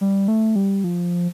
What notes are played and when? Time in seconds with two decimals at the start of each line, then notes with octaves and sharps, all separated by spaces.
0.01 G3
0.28 A3
0.56 G3
0.84 F3